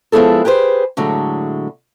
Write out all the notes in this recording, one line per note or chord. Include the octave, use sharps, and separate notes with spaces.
F3 G#3 B3 E4 G#4 A4
G4 G#4 B4 C5
A2 D3 F#3 G#3